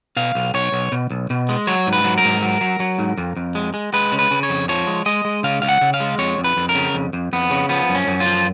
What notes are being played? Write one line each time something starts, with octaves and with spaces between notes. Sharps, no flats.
B2 F5
B1
B1 C#5
B1
B2
B1
B2
G#3
F#3 C#5
G#2
B4
F#3
A#4
G#2
F#3
F#3
F#3
G#2
F2
F2
G#3
G#3
G#3 B4
C#3
B4
C#3
C#5
F2
F3 C#5
G#3
G#3 D#5
G#3
C#3 F5
C#2 F5
F#5
C#3
F5
G#3
F2 C#5
F2
B4
F2
A#4
C#3
F2
F2
F2 B3
C#3
F3 B3
F#2
C#4
F#2
F4
F3